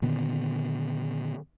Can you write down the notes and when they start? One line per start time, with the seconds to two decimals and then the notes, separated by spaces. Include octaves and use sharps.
0.02 A#2 D3 D#3 B3